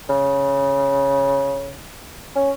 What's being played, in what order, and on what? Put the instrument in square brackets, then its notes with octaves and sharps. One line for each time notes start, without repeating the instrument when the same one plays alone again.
[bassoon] C#3
C#4